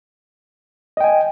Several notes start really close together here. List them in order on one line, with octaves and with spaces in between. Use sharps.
D#5 G5 G#5